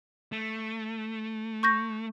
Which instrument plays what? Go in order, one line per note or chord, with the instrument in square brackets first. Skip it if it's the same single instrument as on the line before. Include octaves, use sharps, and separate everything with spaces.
[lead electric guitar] A3
[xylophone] C#6 G6 A#6